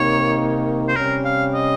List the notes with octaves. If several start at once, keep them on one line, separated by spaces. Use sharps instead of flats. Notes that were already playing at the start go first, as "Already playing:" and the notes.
Already playing: C3 D#3 A#3 D#4 C#5
C5
C3 G3 C#4 A#4
F5
D#5